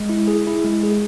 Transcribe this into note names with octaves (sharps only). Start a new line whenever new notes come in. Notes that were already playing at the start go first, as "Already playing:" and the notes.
Already playing: G#3
E4
G#4
E4
G#3
G#4